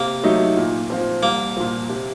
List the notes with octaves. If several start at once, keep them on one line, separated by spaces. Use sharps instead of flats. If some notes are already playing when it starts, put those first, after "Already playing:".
Already playing: C3 A#3
F#3 A3 D#4
A#2
F3 C4 F4
C2 A#3
A#2 F3
C3